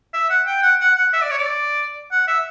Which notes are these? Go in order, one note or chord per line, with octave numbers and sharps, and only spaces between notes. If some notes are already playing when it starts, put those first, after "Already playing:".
E5
F#5
G5
F#5
F#5
F#5
E5
D5
C#5
D5
F#5
E5